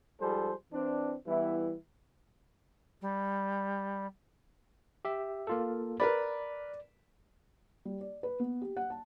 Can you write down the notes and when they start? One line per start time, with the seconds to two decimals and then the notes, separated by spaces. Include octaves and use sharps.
0.21 G#2 F3 G3 G#4 A4 C5
0.73 E3 C4 D4
1.27 E3 G3 B3 E4
3.01 G3
5.05 G4 E5
5.47 A#3 F4 A4
6.00 A#4 B4 D5 B5
7.85 G3
8.01 D5
8.23 B4
8.40 B3
8.61 G4
8.77 F#5
8.90 A5